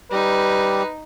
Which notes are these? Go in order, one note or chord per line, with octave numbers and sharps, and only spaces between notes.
G3 D#4 G4 B4